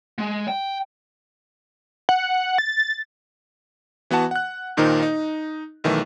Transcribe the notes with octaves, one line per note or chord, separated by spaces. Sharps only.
G#3
G5
F#5
A6
E3 B3 F#4 F#5 A5
F#5 F#6
D#2 A#2 D#3 D#4 A#4 C5
D#4
B1 D#3 E3 A3